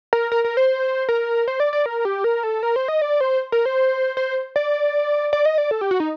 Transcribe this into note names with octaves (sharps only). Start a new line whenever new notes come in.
A#4
A#4
A#4
C5
A#4
C5
D5
D5
A#4
G4
A#4
A4
A#4
C5
D#5
D5
C5
A#4
C5
C5
D5
D5
D#5
D5
A4
G4
F#4
D#4